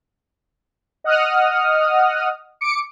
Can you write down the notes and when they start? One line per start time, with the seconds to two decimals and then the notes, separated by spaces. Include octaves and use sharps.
1.04 D#5 F#5 D#6 F6
2.61 D6 C#7 D7